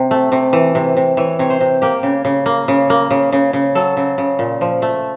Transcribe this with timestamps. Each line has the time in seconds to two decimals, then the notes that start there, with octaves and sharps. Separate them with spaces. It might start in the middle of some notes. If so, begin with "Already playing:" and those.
Already playing: C3
0.11 A3
0.32 C3
0.53 E3
0.75 C3
0.97 C3
1.17 E3 C#5
1.39 C3 C#5
1.50 C5
1.61 C3
1.82 A#3 G4
2.03 C#3
2.25 C#3
2.46 A#3
2.68 C#3
2.90 A#3
3.11 C#3
3.32 C#3
3.53 C#3
3.75 F#3 A4
3.97 C#3
4.18 C#3
4.39 A#2
4.61 F3
4.82 A3